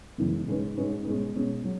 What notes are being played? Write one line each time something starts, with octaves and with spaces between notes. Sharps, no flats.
F#2 C#3 E3 G#3 B3
G#2 G#3 C#4 G#4 B4
G#2 G#3 C#4 G#4 B4
B2 G#3 C#4
B2 G#3 C#4
F#3